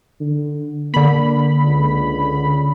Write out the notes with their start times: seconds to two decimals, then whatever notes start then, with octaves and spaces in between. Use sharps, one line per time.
0.20 D3
0.94 D3 A#3 B5
1.63 C#2